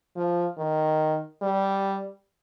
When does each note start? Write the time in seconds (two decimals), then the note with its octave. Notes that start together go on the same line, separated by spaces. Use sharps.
0.16 F3
0.58 D#3
1.42 G3